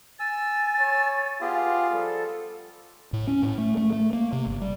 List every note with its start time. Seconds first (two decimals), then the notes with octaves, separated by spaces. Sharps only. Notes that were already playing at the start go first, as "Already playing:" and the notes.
0.20 G#5 E6 A6
0.80 C#5
1.41 B3 F4 G4 G#4
1.91 F3 G3 A4
3.13 A2
3.27 C#4
3.42 A2
3.58 A3
3.77 A3
3.93 A3
4.13 A#3
4.33 C3
4.46 G1
4.61 G3